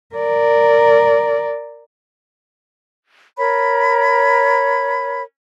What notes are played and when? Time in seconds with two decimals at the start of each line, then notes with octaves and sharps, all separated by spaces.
0.16 A#4 D5
3.38 A#4 C#5 B5